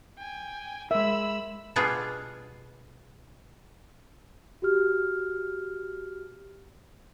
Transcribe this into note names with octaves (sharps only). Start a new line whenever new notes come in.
G5 G#5
G#3 A#4 E5 B5 E6
B2 G3 B3 D4 F4 G#4
F#4 G4 F6